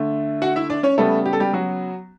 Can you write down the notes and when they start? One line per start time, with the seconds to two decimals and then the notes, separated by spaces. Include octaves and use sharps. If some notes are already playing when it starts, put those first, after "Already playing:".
Already playing: D3 A3
0.42 F#4 F#5
0.56 E4 E5
0.70 D4 D5
0.83 C#4 C#5
0.98 C#3 G3 A3 B3 A4
1.26 G4
1.33 A4
1.40 G3 G4
1.53 F#3 F#4